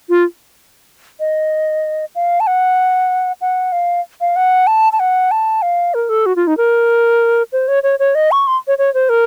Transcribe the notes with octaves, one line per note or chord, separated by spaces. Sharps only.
F4
D#5
F5
A5
F#5
F#5
F5
F5
F#5
A5
A5
F#5
A5
F5
A#4
A4
F#4
F4
D#4
A#4
C5
C#5
C#5
C#5
D#5
C#6
C6
C#5
C#5
C5
A#4